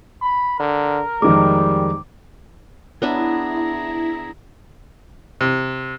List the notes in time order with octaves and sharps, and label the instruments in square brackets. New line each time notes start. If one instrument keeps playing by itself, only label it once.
[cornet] B5
[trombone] D3 [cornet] A#4
[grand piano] F2 D#3 G#3 [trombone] G3 [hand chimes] D6
[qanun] B3 D4 E5 [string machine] E4 [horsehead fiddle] G#4 A#5
[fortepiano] C3